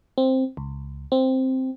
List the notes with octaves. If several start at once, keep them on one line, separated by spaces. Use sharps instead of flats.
C4
C#2
C4